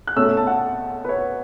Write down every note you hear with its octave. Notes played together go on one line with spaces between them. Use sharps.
F#6
B2 A3 C#4 E6
A5
F#5
B4
C#5